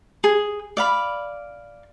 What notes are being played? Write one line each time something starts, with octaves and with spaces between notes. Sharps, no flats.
G#4
D5 F5 B5